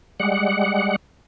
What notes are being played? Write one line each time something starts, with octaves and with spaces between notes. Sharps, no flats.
G3 G#3 F#5